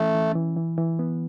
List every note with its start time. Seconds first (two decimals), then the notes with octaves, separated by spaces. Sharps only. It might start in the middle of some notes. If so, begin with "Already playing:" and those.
Already playing: E3 A3 C#4
0.14 E3
0.35 E3
0.56 E3
0.78 E3
0.99 B3